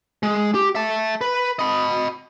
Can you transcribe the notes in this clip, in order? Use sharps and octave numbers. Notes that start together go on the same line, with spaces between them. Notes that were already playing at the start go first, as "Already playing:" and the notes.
G#3
G4
E5 A5
B4
D#5 B5